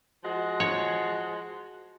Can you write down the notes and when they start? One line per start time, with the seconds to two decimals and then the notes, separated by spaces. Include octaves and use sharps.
0.24 F3 G#3 F#4
0.60 C#5